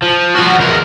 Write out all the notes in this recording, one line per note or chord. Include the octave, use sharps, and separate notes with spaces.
F3
F3 F#4
E2 A#4